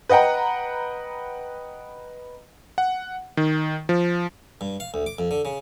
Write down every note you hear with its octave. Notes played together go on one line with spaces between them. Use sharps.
B4 D#5 F#5 G5 A#5
F#5
D#3
F3
G2
F5
D2
D6
F2
D3
C#3